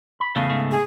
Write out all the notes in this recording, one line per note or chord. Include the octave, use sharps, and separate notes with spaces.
B5
E2 C#3 A3 B3 F5
G#2 A3
G#4